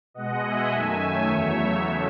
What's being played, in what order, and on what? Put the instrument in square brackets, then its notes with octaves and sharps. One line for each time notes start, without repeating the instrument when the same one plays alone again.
[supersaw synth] B2 G#3 D#5 F#5
E5 G#5
F#2 D#3 A3 E5 G#5
C#5 E5
E2 C#3 F#3 A3